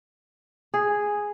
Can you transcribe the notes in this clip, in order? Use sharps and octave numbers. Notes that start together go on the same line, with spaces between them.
G#4